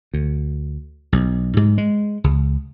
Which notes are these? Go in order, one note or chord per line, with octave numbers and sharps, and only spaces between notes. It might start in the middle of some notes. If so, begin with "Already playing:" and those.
D2
B1
G#2
G#3
C#2